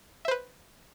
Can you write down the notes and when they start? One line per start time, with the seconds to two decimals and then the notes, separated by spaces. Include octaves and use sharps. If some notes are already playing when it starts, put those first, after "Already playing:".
0.25 E5
0.28 C5
0.31 B4